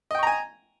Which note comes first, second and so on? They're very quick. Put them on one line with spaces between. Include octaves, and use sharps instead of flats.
D#5 G5 C#6 A#5 G#5